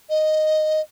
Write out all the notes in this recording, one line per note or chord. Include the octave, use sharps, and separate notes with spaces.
D#5